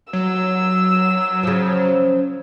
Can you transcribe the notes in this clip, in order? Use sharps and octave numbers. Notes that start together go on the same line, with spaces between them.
F#3 E6
C#3 F3